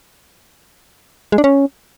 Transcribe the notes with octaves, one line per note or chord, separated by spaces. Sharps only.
G#3
D4
C#4